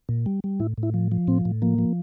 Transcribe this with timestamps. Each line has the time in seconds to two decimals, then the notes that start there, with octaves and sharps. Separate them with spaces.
0.09 A#2
0.26 G3
0.44 G3
0.60 A2 E4
0.78 A2
0.83 E4
0.94 F3
1.12 F3
1.27 A2 C4
1.45 A2
1.62 F3 A#3
1.78 F3